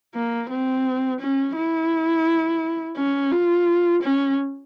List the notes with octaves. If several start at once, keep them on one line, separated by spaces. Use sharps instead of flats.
A#3
C4
C#4
E4
C#4
F4
C#4